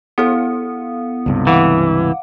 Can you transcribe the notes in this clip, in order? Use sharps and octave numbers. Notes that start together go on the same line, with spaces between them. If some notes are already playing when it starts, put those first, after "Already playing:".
B3 E4 A4 F5
C#2 G2 C3
E3 F5 F#5 D6